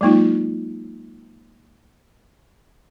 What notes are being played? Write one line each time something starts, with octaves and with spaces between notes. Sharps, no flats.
F#3 G#3 A#3 D#4 F4